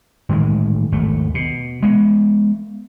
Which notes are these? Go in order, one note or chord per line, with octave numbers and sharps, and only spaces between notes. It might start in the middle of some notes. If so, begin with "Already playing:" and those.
A2 D#3 E3 G#3
G#1 D#2 A3
B2
G#3 B3